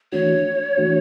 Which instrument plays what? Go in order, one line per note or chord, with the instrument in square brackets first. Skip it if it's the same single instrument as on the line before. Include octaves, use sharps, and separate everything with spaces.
[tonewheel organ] E3 A3 D4 F#4 [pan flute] C#5
[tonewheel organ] E3 A3 D4 F#4